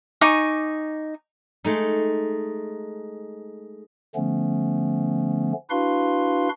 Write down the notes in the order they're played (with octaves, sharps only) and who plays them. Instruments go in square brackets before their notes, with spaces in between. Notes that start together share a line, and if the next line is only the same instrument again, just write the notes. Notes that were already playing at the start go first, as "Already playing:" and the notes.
[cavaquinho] D#4 G#5 C#6 D6
[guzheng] G#3 A3 D#4
[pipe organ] D3 F3 A3 B3 C#4
D4 E4 F#4 B4 F5 C6